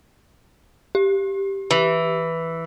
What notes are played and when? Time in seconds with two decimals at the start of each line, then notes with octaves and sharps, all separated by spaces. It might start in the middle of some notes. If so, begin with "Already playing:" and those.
0.95 G4
1.71 E3